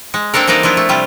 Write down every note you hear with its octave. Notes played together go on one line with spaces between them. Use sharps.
G#3
A#3 C4 D4 A4 A#4
E3 G3 A#3 D#4 D5
F3 D4 E4 F4
A3
C3 G3 F4